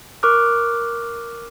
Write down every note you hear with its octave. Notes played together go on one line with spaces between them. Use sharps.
A#4 C#6 D6 F6 F#6